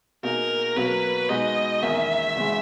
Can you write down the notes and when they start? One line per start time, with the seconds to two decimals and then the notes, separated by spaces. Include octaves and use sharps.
0.23 B2 A#3 D#4 G#4 A#4
0.76 B2 F#3 A#3 B4
1.29 B2 G#3 D#4 F#4 D#5
1.82 E2 D#3 A#3 C#4 E5
2.35 E1 E2 C#3 E3 G#3